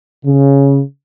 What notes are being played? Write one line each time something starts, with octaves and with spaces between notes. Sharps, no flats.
C#3